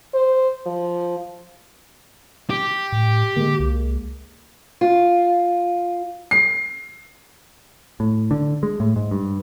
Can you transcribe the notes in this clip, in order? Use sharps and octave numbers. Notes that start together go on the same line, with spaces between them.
C5
F3
G4
A2
D3 G#3 A#3
C2
F4
C7
A2
D3
G#3
A2
G#2
G2